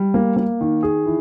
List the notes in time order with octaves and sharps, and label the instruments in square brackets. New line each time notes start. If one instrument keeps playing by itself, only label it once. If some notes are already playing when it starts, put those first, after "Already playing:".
Already playing: [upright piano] G3
A#3
A#3
D#3
G#4
E3